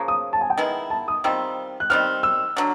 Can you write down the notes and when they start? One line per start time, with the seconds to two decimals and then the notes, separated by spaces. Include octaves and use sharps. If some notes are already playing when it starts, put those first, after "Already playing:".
Already playing: C#3 F3 A#3
0.08 D#6
0.33 A5
0.41 G#5
0.50 G5
0.58 D#3 G#3 B3 E4
0.90 A5
1.08 D#6
1.24 D#3 G3 C4 F4 E6
1.80 F#6
1.90 D#3 G3 C4 F6
2.23 E6
2.57 D3 F#3